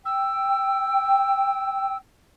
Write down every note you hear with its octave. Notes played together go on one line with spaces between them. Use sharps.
G5 E6